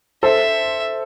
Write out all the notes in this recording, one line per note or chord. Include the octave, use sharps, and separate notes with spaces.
A4 C5 E5